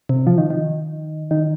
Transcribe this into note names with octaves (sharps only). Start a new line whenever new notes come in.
C3
F3
D#3
D#3
D#3